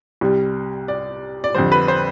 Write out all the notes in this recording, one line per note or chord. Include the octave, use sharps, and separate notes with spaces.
C2 C3 G3
D5
D5
F2 D3 G3 C5
B4
C5